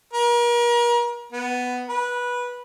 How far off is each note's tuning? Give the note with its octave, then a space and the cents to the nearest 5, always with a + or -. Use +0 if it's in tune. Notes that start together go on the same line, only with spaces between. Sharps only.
A#4 +40
B3 +10
B4 -15